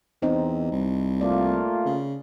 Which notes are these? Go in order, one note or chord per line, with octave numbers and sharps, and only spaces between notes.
E2 C4 D#4
C2
A3 A#3 F4 D5
C#3